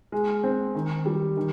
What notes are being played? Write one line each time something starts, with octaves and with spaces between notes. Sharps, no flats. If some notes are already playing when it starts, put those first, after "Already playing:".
G#3
C4
D#3
G3
D#3